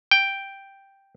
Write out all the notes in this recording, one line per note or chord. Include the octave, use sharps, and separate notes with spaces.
G5